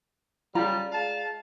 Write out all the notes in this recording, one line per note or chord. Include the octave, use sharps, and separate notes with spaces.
C#3 G3 F4 D5 A#5
G#3 F5 A5